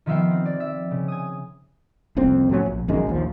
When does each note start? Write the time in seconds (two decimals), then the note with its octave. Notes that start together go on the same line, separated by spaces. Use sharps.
0.06 D#3 F3 B3 E5 F5 G5
0.30 C4
0.46 D5
0.60 E5
0.91 C#3
1.08 G#5 D#6
2.17 F#1 C2 F2 C4
2.49 A2 F3 F#3 C#4
2.66 A#1
2.88 A#1 F#2 D#3 G#3
3.07 A#1 D#2 F3